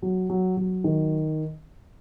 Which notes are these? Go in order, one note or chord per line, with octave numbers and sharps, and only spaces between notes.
F#3
F#3
F#3
D#3